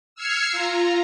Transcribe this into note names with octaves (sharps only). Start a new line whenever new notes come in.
E6 F6 G#6 C7 C#7
F4 A#5